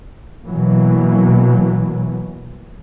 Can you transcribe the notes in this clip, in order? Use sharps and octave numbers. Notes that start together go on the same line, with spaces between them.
B2 E3 F#3 A#3